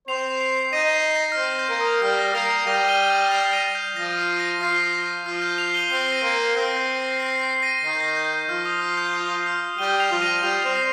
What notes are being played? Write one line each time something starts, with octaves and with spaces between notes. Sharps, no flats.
C4 C5 C7 F7
C7 F7
C7
D#4 D#5 A#6 D#7
C7
A#6
F6
C4 C5 G6
G6
A#3 A#4
D#6
G3 G4 F6
A#6
A#3 A#4 C7 F7
C7 F7
G3 G4 A#6 D#7
D#7 G7
D#7 G7
C7 F7
A#6 D#7
G6
F3 F4 A#6
C7
A#6 D#7
F3 F4 C7
A#6
F3 F4 F6
G6
C7 F7
D#7 G7
C4 C7 F7
A#6 D#7
A#3
C7
C4 A#6
G6
C7
C7
C7
A#6 D#7
D#3 D#4 C7
G6
A#6
G6
G6
F3 F4 F6
D#6
F6
G6
D#6
F6
G3 G4 D#7 G7
C7 F7
F3 F4
A#6 D#7
G3 G4 C7 F7
C4 C5
C7 F7